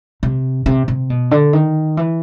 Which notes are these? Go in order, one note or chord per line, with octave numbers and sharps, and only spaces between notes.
C3
C3
C3
B2
D3
D#3
E3